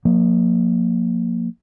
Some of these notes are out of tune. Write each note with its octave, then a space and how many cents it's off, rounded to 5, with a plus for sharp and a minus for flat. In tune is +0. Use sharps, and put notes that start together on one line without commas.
F3 +40 A#3 +0